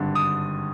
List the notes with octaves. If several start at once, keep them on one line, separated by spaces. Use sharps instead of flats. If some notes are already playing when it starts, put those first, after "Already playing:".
Already playing: G#1 G2 D3
D#6